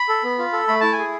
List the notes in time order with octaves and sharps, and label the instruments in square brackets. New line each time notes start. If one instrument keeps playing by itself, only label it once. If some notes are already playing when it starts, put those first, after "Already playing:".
Already playing: [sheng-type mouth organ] B5
A4
B3
F4
A4
A3 B5
E4 A5
G#5
G#4